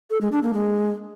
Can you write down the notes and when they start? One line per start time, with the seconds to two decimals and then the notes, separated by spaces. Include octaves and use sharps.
0.10 A4
0.21 G#3
0.32 D4
0.43 A#3
0.54 G#3